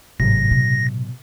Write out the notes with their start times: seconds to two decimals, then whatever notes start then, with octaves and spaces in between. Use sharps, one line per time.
0.20 G#1 A2 C3 F#3 A#6
0.51 B2